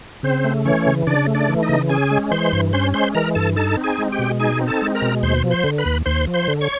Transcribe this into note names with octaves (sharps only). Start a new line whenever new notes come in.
C#3 C4 C5
A3
E3 C#4 C#5
C#3
C#3 D4 D5
A3
D4 D5
E3
D#4 D#5
C#3
C#4 G#4 G#5
G#3
E3 C5 C6
G2
C#4 C5 C6
G#3 C5 C6
E3 A#4 A#5
G2 A4 A5
D#4 A4 A5
C4
G#4 G#5
G#3
G4 G5
B2
D#4 G#4 G#5
C4
A4 A5
G#3
A#4 A#5
B2
D#2 C5 C6
F3
C5 C6
D3
B4 B5
D#2
D#2 C5 C6
F3
C5 C6
D3
C#5 C#6